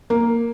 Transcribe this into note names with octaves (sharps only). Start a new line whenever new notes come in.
A#3